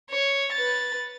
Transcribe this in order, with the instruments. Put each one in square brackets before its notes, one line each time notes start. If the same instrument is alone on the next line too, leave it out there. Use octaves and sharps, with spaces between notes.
[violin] C#5
B4 A6